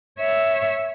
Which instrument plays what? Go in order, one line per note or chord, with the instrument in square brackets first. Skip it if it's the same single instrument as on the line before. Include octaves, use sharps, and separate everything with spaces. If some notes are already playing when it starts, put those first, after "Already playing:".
[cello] C#5 E5